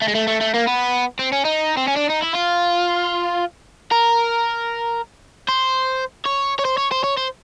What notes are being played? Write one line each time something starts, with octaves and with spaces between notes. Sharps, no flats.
A3
G#3
A3
A3
A3
A#3
B3
C4
C#4
D#4
C4
C#4
D4
D#4
E4
F4
A#4
C5
C#5
C#5
C5
C#5
C5
C#5
C5